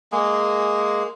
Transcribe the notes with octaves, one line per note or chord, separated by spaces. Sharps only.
G#3 A#3 G#4